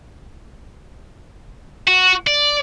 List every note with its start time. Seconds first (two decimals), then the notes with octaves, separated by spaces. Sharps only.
1.88 F#4
2.27 D5